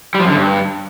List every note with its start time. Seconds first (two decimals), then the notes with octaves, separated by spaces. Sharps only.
0.15 G3
0.20 F3
0.25 F#2
0.30 D3
0.35 G2